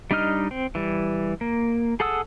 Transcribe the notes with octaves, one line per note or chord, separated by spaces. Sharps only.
G3 D4 D#4 D#5 F6
C4
E3 G3
A#3
G#4 A4 F#5 D#6 E6